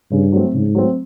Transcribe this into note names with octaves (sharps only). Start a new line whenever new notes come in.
G2 C#3
F#3 A3 C4
G#2 C#3
F#3 A3 C4